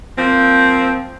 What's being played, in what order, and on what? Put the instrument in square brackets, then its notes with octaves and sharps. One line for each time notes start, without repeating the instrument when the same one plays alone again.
[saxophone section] F3 A#3 C4